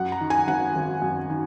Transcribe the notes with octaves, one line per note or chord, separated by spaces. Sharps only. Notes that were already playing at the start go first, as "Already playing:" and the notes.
Already playing: F#2 F#5
A#5
D#3
G#5
G#1 F#5
G#1
F#2
D#3